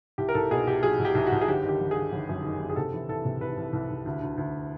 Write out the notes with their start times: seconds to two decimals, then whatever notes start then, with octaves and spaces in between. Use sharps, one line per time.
0.18 C2 G4
0.29 A#4
0.34 C2 A4
0.51 B2 G#4
0.67 C2 G4
0.83 F#3 G#4
0.99 C2
1.05 G4
1.15 C2
1.27 F#4
1.32 C2
1.41 G#4
1.48 G1 G4
1.64 D#3 G4
1.80 G1
1.91 G1 G#4
2.12 G1
2.29 F#2
2.44 D#3
2.60 F#2
2.70 G#4
2.76 C3 A4
2.93 E3
3.08 C2 A4
3.25 C3
3.41 C2 B4
3.57 C2
3.73 C2
3.90 C2
4.06 D2
4.22 D2
4.38 D2